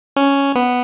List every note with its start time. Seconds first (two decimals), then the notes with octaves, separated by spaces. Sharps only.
0.16 C#4
0.55 B3